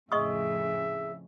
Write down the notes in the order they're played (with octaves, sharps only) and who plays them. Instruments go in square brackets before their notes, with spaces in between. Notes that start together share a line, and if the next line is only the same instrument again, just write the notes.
[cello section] F2 A2 C#3 [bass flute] G#4 [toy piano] D#5 C#6 D#6 [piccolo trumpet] E5